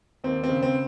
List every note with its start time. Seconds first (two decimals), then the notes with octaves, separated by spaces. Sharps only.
0.24 D#2 C4
0.44 C4
0.49 C#3
0.63 C4